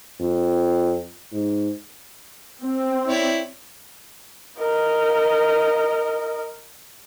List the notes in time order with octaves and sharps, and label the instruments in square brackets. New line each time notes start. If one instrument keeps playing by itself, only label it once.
[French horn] F2
G#2
[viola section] C4
[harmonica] E4 C#5 D5
[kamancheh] A#4 D#5